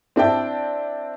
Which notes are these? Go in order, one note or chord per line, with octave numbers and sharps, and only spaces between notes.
C4 D4 E4 G5 A5